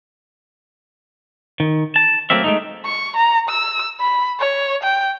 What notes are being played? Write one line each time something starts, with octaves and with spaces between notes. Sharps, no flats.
D#3
A5
F#3 A3 A#3 C4 E5
G#3 A3 D#4
C#6
A#5
E6
B5
C#5
G5